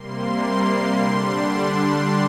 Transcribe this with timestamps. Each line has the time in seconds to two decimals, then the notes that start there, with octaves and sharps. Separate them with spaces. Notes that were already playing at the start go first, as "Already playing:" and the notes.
Already playing: C3 G3 A#3 C6
0.95 D3 G3 D4